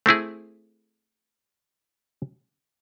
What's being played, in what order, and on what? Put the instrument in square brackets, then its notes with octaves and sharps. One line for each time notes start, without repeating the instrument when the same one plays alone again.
[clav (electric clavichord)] A3 C4 E4 G#4